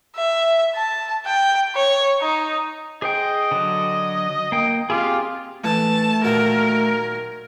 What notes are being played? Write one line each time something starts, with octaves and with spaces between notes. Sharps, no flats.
E5
A5
G5
C#5
D#4
G#4 C5 D#5 G5
D3 F#3
A#3 G5
C4 F4 G4 G#4
E3 A3 A5
A#2 D#3 F#3 A#4